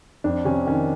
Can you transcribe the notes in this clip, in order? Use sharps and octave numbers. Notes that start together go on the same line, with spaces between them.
F2 D4
C3 C#4
D#3 C#4